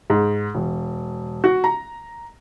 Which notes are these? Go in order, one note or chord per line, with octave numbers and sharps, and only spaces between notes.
G#2
E1
F#4
A#5